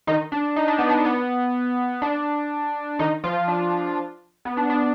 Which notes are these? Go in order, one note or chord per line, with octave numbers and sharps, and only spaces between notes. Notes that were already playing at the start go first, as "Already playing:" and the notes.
D#3 D#4
D4
D#4
D4
B3
D4
B3
D4
D#3 D#4
F3 F4
D4
B3
D4
D4